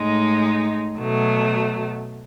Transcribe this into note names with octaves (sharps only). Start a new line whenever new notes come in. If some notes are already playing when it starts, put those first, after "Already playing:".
Already playing: A2 G#3 D#4
B2 F#3 A3